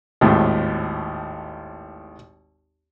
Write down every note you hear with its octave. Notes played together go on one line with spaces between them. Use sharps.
G#1 D#2 A2